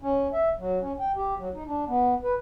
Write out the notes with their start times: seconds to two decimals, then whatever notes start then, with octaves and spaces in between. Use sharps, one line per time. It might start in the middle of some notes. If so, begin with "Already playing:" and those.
0.02 C#4
0.33 E5
0.59 F#3
0.82 C#4
1.00 G5
1.16 G4
1.39 F#3
1.54 D#4
1.67 D4
1.88 B3
2.23 B4